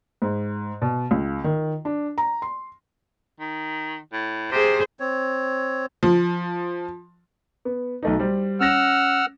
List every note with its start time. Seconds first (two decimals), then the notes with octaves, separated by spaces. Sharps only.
0.22 G#2
0.82 B2
1.11 C#2
1.44 D#3
1.85 D4
2.18 A#5
2.42 C6
3.40 D#3
4.13 A2
4.52 C3 G#4 C5
5.00 C4 C#5
6.03 F3
7.65 B3
8.03 B1 A3 D#4
8.19 G3 C5
8.60 C#4 F#5 E6 F6 A#6 E7